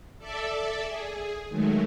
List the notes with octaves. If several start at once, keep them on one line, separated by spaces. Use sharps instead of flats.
A4 D5 E5
G#4
D#3 F#3 G#3 A3